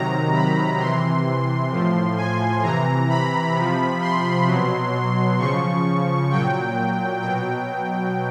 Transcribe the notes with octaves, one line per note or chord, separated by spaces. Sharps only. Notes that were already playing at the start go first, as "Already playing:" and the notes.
Already playing: C3 D#3 F#3 A#5
B5
C3 E3 C6
A2 F3
G#5
C3 E3 A#5
B5
C3 F3
C6
B2 F#3
C#3 F3 C#6
A#2 F#3 G5
B2 F#3 G5